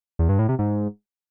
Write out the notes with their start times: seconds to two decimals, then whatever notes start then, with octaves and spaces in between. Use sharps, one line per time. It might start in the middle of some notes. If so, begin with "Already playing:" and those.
0.19 E2
0.29 G2
0.39 A2
0.49 C3
0.59 G#2